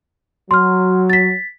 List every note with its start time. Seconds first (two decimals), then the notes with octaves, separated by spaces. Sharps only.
0.51 F#3 C6 F6
1.10 A6 B6